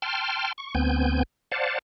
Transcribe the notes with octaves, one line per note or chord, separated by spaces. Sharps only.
G5 A5 C6 F6
C#6
D2 B3 C4 G#5 G6
C5 D5 F5 F#5 A5